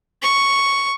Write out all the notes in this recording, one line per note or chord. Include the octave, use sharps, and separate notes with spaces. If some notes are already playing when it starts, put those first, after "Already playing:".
C#6